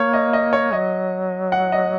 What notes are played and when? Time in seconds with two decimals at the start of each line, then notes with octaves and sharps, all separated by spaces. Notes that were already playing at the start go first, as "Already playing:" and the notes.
Already playing: A#3 C#5
0.13 D#5
0.33 D#5
0.53 C#5
0.73 F#3 D#5
1.52 F#5
1.72 D#5